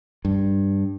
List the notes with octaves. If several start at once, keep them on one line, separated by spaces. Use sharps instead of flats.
G2